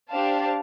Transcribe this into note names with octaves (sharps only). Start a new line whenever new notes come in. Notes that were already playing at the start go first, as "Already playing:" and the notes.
D4 G4 C5 F5 A5